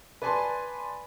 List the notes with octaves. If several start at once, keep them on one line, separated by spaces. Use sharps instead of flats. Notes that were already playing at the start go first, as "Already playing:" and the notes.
B4 D5 G#5 A5 C6